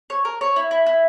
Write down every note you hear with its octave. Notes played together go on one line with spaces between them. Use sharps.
C#5
A#4
C#5
E4
E4
E4